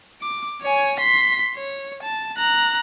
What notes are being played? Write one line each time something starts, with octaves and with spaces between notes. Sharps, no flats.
D6
C#5 G#5
C6 B6
C#5
A5
A#5 F#6